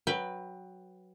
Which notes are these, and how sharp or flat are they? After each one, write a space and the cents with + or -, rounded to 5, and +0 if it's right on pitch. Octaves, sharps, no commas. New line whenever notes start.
F#3 +0 B4 +0 G5 +20